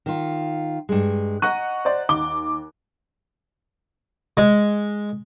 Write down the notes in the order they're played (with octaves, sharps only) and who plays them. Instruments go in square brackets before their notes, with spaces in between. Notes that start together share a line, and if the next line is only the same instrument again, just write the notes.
[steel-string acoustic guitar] D#3 F4
G2 G#3
[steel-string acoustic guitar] D#5 F#5 A#5 [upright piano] C#6 F#6 D#7
[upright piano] C5 D5
D#2 D6 G7
[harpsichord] G#3